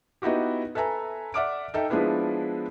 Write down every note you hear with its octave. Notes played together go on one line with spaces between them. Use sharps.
B3 D#4 E4 F#4 G4
A4 B4 E5 G#5 A#5
D5 E5 F#5 D6 F6 D7
D#4 A4 E5 G5
F3 G#3 B3 D4 E4 B4